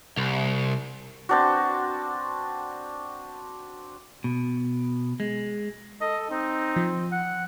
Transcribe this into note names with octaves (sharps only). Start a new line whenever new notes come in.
C2
C4 D4 F#4
B2
G#3
A4 D#5
C4 D#4
F3
F#5